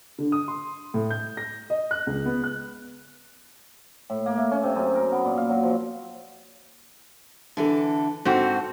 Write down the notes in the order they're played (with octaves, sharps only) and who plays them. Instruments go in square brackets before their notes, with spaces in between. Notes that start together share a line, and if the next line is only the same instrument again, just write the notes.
[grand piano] D3
D#6
C6
A2
G6
A#6
D#5
F#6
C#2
B3
F#6
[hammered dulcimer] A2
A#3
A3
C#4
C3
F#2
A#4
B3
A#2
F5
F#3
F3
[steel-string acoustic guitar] D3 E3 A4
[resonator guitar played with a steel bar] G#2 C4 F#4 [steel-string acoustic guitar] A4